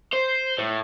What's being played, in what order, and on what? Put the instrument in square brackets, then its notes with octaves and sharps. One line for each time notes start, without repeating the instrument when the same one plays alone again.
[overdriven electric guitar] C5
A2